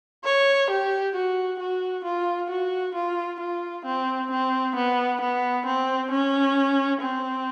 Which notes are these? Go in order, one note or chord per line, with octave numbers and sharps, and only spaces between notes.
C#5
G4
F#4
F#4
F4
F#4
F4
F4
C4
C4
B3
B3
C4
C#4
C4